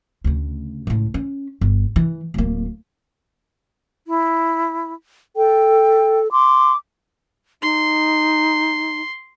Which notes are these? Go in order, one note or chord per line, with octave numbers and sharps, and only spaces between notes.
D2 C#3
C#2 A2
C#4
G1
E3
D1 A#3
E4
A4 G5
C6 D6
D#4 C6